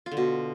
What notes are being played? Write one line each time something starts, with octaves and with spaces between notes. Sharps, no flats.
F4
D3
B2